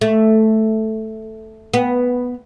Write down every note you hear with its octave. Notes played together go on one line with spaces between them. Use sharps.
A3
B3